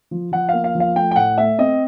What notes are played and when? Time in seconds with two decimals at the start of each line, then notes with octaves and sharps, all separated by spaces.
0.11 F3
0.32 F3 F#5
0.49 A#3 F5
0.64 F5
0.75 F3
0.80 F5
0.95 A3 G5
1.11 G5
1.16 A2 F#5
1.38 A3 E5
1.58 C4 D#5